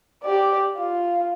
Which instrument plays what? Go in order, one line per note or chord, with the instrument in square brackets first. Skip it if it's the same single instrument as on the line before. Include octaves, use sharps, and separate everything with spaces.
[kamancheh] G4 D5
F4